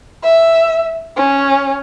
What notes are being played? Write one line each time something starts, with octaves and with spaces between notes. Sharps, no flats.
E5
C#4